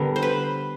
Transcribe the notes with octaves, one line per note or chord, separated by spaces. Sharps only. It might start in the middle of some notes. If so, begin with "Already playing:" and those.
Already playing: D3 G3 B3 A#4
C5
B4